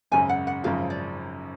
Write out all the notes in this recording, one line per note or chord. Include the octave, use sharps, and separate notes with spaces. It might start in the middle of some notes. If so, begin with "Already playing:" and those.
G#1 F#2 C#3 G#5
F#5
F#5
G#1 F#2 C#3 F3 F5
D5